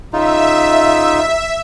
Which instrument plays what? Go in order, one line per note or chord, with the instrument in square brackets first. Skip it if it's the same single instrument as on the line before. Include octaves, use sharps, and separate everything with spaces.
[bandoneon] C#3 D#4 F4 [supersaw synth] E5